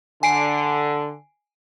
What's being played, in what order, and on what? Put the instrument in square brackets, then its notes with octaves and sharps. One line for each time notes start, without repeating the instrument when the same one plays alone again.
[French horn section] D3 [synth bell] G#5 C7 D7